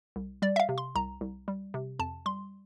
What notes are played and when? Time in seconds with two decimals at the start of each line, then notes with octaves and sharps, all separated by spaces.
0.16 C2
0.42 G3 D5
0.56 E5
0.60 F5
0.69 C3
0.78 C6
0.95 C2 A#5
1.21 C2
1.48 G3
1.74 C3
1.99 F2 A5
2.26 G3 C6